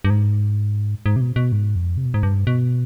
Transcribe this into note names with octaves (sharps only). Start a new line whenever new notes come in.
G2
G#2
G#2
C3
B2
B2
G#2
F2
C3
B2
G#2
G2
B2